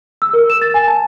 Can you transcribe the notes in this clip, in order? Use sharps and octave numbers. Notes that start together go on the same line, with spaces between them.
E6
A#4
E7
A6
G#5
A5